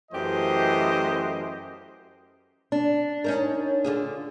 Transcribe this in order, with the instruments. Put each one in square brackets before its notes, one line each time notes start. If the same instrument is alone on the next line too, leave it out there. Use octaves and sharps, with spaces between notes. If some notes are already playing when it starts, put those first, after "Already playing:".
[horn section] F#2 E3 A3 G4 C5 D#5
[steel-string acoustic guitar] D4
[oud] C#4 D#4 A#4
D3 F4 G#4